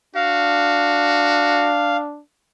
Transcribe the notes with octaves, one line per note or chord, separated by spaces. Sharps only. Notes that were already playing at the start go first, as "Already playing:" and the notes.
D4 F#4 F5